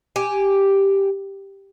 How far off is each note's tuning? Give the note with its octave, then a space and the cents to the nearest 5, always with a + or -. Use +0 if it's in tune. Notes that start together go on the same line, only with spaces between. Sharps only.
G4 +0 G#5 +0